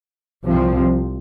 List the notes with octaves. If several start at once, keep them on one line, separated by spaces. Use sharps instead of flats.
C2 C3 F3 C4